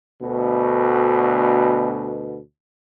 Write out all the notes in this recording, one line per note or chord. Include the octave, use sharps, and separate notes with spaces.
D2 B2